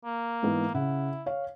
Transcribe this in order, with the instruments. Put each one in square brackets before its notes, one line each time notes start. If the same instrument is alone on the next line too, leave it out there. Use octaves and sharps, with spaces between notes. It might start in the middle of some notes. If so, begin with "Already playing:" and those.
[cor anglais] A#3
[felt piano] G#2 E3 B3
[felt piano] C#3 F#5 [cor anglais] E4
[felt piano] C#5 F5